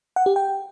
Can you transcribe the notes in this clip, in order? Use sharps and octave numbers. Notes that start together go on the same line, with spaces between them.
F#5
G4
G5